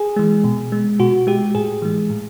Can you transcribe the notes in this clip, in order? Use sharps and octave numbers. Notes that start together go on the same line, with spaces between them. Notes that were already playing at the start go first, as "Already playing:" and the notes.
Already playing: G#4
E3 G#3
B2
G#3
B2 F#4
G#3 G4
A2 G#4
E3 G#3
A2